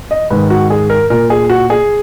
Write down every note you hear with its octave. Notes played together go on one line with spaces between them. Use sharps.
D#5
G#2 D#3 B4
F#4
G#4
A#4
A#2 A#4
G#4
F#4
G#4